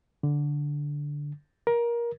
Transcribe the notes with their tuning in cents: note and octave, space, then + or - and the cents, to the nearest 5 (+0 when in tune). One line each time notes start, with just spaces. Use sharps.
D3 -5
A#4 +20